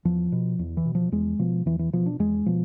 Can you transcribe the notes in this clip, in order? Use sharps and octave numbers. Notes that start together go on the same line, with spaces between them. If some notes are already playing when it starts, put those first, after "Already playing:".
E2 F3
B2
E2
E3
B2
F3
E2 G#3
B2 F3
E2 E3
E3
B2 F3
D4
E2 G#3
B2 F3